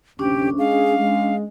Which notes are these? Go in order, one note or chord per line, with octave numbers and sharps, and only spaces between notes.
F#1 D2 C3 C#4 D4 G4
G#3 G#4 F5
G#3